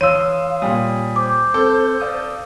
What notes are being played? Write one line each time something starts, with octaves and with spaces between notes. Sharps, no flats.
E3 C#5 F5 C6 D#6 E6 D#7
A#2 G3 G5 G#5 D#6
C5 D6
C4 A4
D5 F5 D#6